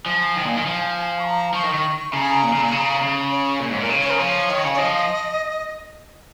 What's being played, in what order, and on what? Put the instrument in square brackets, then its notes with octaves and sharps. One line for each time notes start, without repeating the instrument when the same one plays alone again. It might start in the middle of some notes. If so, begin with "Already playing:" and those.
[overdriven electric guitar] F3 [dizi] G#5
[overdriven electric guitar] D#3
A#2
D#3
F3
[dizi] C#6
A#5
[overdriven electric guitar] F3 [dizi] C#6
[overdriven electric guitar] D#3
D#3
[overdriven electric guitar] C#3 [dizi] A#5
[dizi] G#5
A#5
[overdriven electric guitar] A#2
C#3
A#2
C#3
C#3
[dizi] C#5
[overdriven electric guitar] A#2
G#2
[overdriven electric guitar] A#2 [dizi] A#4
[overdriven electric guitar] C#3 [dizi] C#5
[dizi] C#5
A#4
[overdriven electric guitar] F3 [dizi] C#5
[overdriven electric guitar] D#3
C#3
[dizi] C#5
[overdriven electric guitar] F3 [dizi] D#5